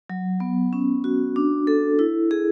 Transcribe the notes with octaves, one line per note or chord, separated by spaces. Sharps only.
F#3
B3
C#4
F#4
D4
A4
E4
G#4